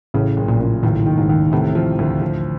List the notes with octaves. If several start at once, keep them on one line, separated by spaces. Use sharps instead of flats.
A1 A2 C#3
F#1
A#1 A#2
F#1
A1 D#2 A2
D#3
G#1 G#2
D#2
A1 A2 C3
F3
D2
F3